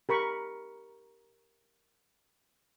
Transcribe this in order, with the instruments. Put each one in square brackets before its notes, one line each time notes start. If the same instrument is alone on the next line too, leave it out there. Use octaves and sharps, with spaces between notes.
[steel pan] G4 A#4 B5 C#6